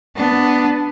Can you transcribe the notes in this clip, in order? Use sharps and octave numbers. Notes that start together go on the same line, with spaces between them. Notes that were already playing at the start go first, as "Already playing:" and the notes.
B3 D4